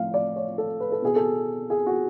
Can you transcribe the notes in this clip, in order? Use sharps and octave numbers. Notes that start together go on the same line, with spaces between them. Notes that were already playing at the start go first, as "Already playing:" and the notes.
Already playing: A2 F3 F5
D5
C#5
A4
B4
A4
B2 G#4
A4
G#4
F#4